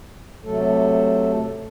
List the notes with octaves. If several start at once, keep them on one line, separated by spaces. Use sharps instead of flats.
C3 F#3 A3 A4